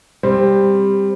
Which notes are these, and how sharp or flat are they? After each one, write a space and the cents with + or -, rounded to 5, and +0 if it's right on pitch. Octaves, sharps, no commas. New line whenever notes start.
G3 +10 C4 +5